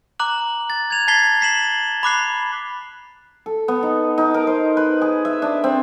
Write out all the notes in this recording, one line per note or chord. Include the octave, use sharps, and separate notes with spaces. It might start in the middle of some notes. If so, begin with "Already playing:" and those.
A#5 D6 F#6 F#7
A6
G#6 F7
A5 G#6 A6 B6 C7 G7
B6 C7 E7 F#7 G7
B5 D6 F#6 C7
A4
B3
D#4
D#4
A#4
C5
B4
G#4
E5
D4
C4